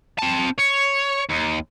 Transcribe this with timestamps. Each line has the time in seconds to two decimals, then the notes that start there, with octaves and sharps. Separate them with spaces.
0.19 C4 A5
0.59 C#5
1.30 D#2